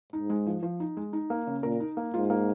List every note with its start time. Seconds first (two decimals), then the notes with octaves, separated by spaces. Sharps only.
0.13 G#2 D#4
0.30 G#3
0.46 F3
0.63 F3
0.80 D#4
0.97 G#3
1.13 D#4
1.30 A#3
1.47 C#3
1.63 A#2 A#4
1.80 D#4
1.97 A#3
2.14 G#2 F4
2.30 A#3